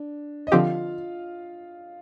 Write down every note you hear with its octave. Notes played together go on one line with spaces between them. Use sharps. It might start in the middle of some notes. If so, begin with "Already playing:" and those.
Already playing: D4
D#5
D3 F3 C4 F4 G4 F5